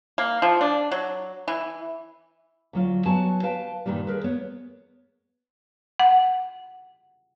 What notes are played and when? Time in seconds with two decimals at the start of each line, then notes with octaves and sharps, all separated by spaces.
0.18 A#3
0.42 F3
0.61 D4
0.91 F#3
1.48 E3
2.73 D2 F#3 F4
3.06 F#3 B3 F#4 G#5 A5
3.43 B4 F5 G5 A5
3.86 G2 A#2 D#3 E3 G3
4.07 G#4 A#4 B4
4.24 B3 C#5
6.00 F#5